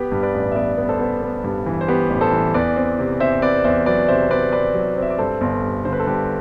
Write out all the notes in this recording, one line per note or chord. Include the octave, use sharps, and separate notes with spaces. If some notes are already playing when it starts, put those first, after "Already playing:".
Already playing: B3 G4 B4
G2
B4 D5
A1
E5
B3 B4 D5
B3
A4 C5
B3
B3
G2
E3
C5
B3 G4 B4
A1
A4 C5
E3
E2 B4 D5
C4
C3
C3 C5 E5
C4 B4 D5
E2 C5 E5
F#3 B4 D5
C3 C5 E5
C4 B4 D5
C4 B4 D5
F#3
C4
E5
D5
G2 A4 C5
G1
G2
D3 C5
B4
A4
G2 G4 B4